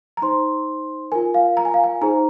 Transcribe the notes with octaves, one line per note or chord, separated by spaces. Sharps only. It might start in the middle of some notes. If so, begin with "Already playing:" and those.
A#5
D#4 C5 C6
F4 A#4 G#5
F5
A#5
G#5
F5
G#5
D#4 G#4 C5 A#5